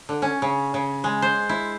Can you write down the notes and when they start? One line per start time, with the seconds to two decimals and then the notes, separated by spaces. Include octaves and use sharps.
0.09 D3
0.22 C#4
0.42 C#3
0.74 C#3
1.04 G#3
1.22 C5
1.49 E4